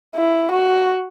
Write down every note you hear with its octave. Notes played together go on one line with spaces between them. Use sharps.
E4
F#4